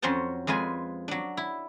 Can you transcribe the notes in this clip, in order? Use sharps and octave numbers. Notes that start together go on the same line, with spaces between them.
F2 F#3 C#4 C5 F#5 A5
F2 G#3 F4 B4 G#5
F#3 D4
E4